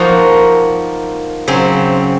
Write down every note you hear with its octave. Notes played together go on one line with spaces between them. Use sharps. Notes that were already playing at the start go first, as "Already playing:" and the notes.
Already playing: F3 A#3 D#4 F#4
C#3 F#3 C4